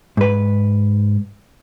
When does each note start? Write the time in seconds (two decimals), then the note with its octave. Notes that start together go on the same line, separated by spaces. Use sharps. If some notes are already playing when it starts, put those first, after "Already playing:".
0.17 G#2 B4